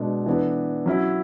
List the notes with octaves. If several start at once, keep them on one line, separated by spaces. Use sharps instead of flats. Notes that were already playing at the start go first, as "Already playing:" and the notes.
Already playing: B2 G#3 B3 D4 A4
E3 B3 D4 A4
F#3 C#4 E4